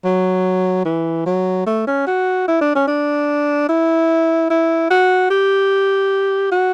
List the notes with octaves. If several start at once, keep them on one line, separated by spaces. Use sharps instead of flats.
F#3
E3
F#3
A3
C#4
F#4
E4
D4
C#4
D4
E4
E4
F#4
G4
F#4